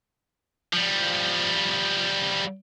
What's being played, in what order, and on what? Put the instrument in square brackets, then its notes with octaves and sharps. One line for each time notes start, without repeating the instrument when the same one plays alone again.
[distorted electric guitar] F3 G3